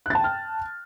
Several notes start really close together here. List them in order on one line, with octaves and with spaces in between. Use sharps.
F#6 A6 A5 G5 F6